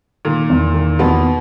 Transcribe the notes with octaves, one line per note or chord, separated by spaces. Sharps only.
A#2 D#3 A#3
E2
D#3
E2 B2 B3